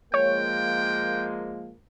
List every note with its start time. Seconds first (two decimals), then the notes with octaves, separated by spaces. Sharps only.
0.14 F3 G#3 A#3 C#5 G5